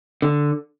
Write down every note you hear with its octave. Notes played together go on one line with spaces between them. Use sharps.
D3